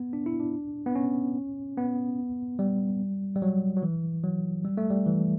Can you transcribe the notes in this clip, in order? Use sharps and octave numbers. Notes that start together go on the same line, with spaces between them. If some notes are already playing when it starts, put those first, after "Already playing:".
Already playing: B3
D4
E4
D4
B3
C#4
B3
G3
G3
F#3
F#3
E3
F#3
G3
A3
G3
E3